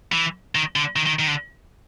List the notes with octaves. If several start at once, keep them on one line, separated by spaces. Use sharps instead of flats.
E3
D#3
D3
D#3
D#3
D#3
D3